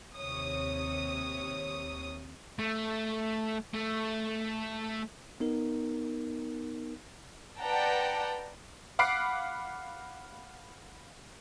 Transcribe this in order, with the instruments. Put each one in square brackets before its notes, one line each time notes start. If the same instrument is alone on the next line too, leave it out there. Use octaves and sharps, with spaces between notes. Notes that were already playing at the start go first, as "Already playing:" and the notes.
[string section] D#2 C3 C#5 D#6
[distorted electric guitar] A3
A3
[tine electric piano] B3 D#4 A#4
[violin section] B4 D5 F#5 G5 A5 A#5
[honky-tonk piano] F5 F#5 B5 D6 C7 D7